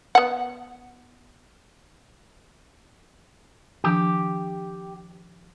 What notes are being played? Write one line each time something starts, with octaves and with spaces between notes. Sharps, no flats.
B3 F#5
D#3 F3 D4 G4